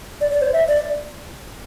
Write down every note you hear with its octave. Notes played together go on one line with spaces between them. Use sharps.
D5
D5
C5
E5
D5